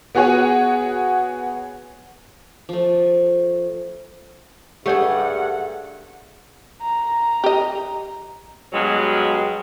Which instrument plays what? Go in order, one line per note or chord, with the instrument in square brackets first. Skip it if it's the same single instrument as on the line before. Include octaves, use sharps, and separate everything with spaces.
[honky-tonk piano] B3 F#4 G#4 C#5 F#5 G#5
[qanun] F3 A3
[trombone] G2 [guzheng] A3 G#4 [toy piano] G4 C#5 [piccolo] F#5
[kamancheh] A#5
[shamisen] G4 D#5
[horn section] G2 B2 F#3 G#3